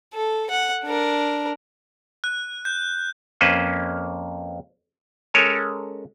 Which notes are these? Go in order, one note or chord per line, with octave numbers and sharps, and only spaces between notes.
A4
F#5
D4 A#4
F#6
G6
F2 A#3 C#4 B4 C5
G#3 C#4 A4 A#4 C#5 G#5